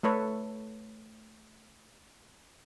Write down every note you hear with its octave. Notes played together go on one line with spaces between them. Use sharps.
A3 A4 B4 C#5